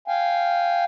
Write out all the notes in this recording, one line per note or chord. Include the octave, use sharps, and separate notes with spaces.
F5 G5 G#5